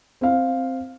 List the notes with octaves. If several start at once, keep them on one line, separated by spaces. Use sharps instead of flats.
C4 F5